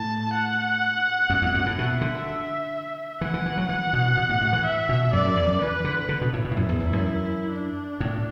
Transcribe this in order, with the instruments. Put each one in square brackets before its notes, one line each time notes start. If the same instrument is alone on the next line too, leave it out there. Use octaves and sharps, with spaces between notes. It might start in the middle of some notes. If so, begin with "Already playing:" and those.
Already playing: [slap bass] A2 [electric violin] A5
[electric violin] F#5
[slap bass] F#2
E2
F#2
A2
[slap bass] B2 [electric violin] E5
[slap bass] D3
[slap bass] E3 [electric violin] F#5
[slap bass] E3
E3
F#3
[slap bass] E3 [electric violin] F#5
[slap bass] B2
B2
A2
A2
E3
[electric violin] E5
[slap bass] B2
[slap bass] F#2 [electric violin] D5
[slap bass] F#2
E2
F#2
[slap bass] E3 [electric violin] B4
[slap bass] D3
D3
B2
A2
B2
A2
[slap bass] F#2 [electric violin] E4
[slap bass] E2
E2
F#2
[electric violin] D4
[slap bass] A2